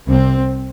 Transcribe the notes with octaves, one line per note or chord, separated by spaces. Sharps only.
C2 C3 C4